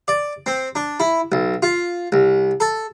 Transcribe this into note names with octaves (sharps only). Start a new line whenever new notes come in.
D5
C4
D4
E4
B1
F4
C2
A4